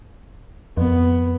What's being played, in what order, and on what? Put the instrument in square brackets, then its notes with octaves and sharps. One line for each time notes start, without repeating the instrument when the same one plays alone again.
[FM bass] F2 [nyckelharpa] B3